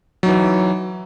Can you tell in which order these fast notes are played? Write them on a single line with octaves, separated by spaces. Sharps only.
F#3 D#4 E3